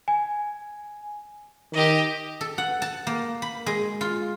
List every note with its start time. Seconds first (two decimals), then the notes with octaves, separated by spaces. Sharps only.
0.08 G#5
1.73 D#3 G4 D#5
2.41 A4
2.58 F#5
2.82 A5
3.07 A#3
3.42 B5
3.66 G#3
4.01 F4